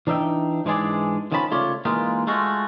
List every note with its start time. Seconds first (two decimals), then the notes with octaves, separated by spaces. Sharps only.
0.07 E3 D4 D#4 E5 G5
0.65 G#2 E3 G#3 D4 G#4 D5
1.32 D#3 F3 C#4 A5 B5
1.51 C2 C#3 A3 F4 C#5 D5
1.85 E3 G#3 A#3 D#4 F4
2.27 G#3 A3 F4 F#4